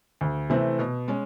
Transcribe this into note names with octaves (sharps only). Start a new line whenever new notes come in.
D2
C3 E3 A3 C4
B2
G#3 C#4